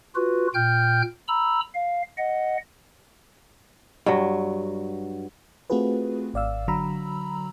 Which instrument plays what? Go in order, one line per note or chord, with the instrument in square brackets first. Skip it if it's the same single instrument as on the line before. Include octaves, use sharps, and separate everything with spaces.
[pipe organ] F4 F#4 B4
A#2 G5 F6 G6
A#5 B5 E6
F5
D#5 F#5
[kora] G2 F#3
[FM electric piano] A3 C4 F4 F#4 G#4 B4
G#1 D5 F5 E6
D3 F#3 F#4 A#5 B5 E6